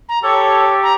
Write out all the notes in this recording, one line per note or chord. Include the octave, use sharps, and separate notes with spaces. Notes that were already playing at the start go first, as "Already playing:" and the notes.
A#5
G4 A4 C#5
A#5